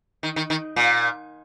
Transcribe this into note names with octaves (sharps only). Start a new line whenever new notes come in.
D#3
D#3
D#3
A#2